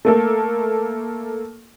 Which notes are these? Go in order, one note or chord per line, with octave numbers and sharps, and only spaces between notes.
A3 A#3 A4